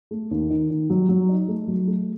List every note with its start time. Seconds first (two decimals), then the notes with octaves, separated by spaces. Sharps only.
0.11 A3
0.31 D#2
0.50 D#3
0.71 D#3
0.90 F#3
1.09 F#3
1.29 D#4
1.48 A3
1.68 F#3
1.87 A3